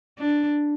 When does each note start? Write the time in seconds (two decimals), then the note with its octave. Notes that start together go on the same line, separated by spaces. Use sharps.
0.19 D4